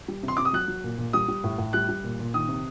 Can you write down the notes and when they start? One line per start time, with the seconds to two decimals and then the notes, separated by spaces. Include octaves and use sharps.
0.08 G3
0.23 C3
0.28 C6
0.37 C3 D6
0.45 D#6
0.53 F#3 F#6
0.68 F#3
0.84 A#2
0.98 A#2
1.13 G3 D#6
1.28 G3
1.44 A2
1.58 A2
1.73 G3 F#6
1.89 G3
2.04 A#2
2.19 A#2
2.34 D#3 D#6
2.48 C3